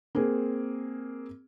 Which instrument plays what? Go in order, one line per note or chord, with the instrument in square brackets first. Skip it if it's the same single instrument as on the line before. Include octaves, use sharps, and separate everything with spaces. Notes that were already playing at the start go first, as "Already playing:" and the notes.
[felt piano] A#3 C4 G#4